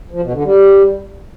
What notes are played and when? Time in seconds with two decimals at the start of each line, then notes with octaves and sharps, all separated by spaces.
0.11 F3
0.22 B2
0.33 D3
0.43 G3